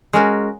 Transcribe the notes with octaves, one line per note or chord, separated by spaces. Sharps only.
G#3 C#4 F#4 A#4